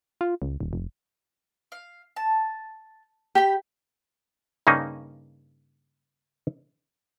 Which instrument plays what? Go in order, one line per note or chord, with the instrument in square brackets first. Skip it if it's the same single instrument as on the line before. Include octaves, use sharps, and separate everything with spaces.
[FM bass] F4
C#2
D#1
F1
[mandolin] F5
A5
[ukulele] G4 [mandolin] G5 B5
[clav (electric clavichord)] G2 C#3 A#3 C#4 D#4